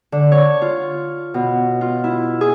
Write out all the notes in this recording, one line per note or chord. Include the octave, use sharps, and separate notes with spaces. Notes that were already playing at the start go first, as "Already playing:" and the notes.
D3
C#5
F4
B2
F4
E4
G#4